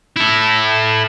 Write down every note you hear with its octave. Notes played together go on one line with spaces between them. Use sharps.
E4 A4